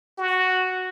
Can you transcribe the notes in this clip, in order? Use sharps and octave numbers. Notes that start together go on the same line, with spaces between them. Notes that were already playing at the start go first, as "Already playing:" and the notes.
F#4